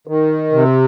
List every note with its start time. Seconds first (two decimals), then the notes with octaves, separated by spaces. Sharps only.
0.07 D#3
0.53 C3